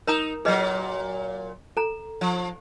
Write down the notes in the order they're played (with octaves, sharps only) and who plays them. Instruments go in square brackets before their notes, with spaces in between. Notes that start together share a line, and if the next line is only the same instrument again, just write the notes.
[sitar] D#4 [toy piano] A#4 A#5 D#6
[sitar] A#2 F#3 [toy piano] G#4 B4 D#5
[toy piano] A4 A#5
[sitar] F3